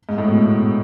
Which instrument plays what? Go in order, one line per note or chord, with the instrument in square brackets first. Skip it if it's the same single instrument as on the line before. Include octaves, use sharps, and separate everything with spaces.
[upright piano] G#2
A2
B2